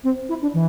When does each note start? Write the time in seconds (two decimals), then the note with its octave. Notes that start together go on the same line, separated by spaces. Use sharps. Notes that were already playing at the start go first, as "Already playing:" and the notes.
0.03 C4
0.29 E4
0.41 D4
0.53 E3